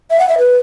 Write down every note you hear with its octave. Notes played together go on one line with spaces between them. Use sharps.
E5
F#5
E5
B4